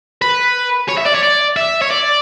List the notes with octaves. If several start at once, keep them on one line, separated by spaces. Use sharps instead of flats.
B4
C#5
E5
D5
C#5
D5
E5
C#5
D5